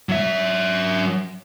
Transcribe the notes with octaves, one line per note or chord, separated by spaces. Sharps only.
F#3 E5